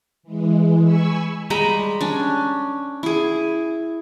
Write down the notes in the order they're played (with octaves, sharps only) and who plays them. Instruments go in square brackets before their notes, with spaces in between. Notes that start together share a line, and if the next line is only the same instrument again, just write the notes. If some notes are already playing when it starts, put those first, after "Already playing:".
[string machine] E3 G#3
G#5 B5 C#6 E6
[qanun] G3 G#3 A#5 B5
C#4 D4
E4 G#4